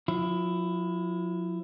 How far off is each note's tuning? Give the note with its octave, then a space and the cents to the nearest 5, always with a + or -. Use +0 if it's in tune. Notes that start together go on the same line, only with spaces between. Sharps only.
F3 +45 E4 +15